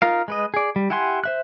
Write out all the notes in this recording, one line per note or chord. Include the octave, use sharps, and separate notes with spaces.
D#4 F4 A#4 F5
G#3 B4 D#5
G#4 D5
G3
E4 G4 F#5 G#5 C6
C5 E5 F#6